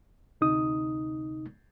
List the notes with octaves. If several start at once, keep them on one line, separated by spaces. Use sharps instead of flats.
D2 C3 D#4 D#6